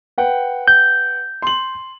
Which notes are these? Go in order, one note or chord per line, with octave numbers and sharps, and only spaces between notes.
B4 F#5 G5
G6
C6 F#7